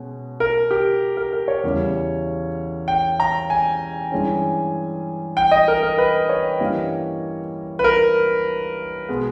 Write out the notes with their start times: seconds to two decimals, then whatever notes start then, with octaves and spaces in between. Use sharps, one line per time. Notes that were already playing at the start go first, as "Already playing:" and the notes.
Already playing: B2 G#3 C#4
0.40 A#4
0.71 G4
1.17 A#4
1.33 A#4
1.48 C#5
1.64 E2 C#3 E3 G3 C#4
2.88 G5
3.20 A#5
3.50 G#5
4.12 G2 E3 G#3 C#4
5.37 G5
5.51 D#5
5.68 A#4
5.83 A#4
5.98 B4
6.29 C#5
6.60 G2 E3 G3 A#3 C#4
7.79 B4
7.84 A#4
9.09 B2 G#3 B3